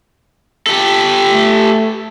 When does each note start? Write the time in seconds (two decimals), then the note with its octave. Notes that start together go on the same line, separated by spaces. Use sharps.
0.67 G4 A4
1.30 A3